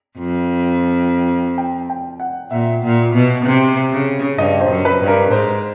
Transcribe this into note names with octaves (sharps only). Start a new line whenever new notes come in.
F2
G5
G5
F#5
A#2 E5
A#2
B2
C3
C#3
G2 D#5
C5
F#2
B4
G2
A#4
G#2 C5